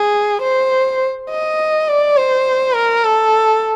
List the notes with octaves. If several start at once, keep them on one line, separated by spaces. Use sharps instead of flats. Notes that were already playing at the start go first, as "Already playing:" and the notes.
Already playing: G#4
C5
D#5
D5
C5
A#4
A4